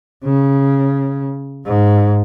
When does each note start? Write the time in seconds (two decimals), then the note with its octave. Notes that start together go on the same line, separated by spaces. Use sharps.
0.25 C#3
1.66 G#2